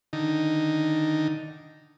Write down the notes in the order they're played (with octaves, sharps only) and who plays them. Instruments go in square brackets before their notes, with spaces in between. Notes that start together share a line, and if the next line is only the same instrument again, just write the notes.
[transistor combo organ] D3 D#3 D#4